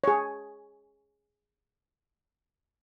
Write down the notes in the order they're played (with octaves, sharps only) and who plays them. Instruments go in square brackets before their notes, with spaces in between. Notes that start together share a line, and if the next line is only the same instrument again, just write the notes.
[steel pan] G#4 C#5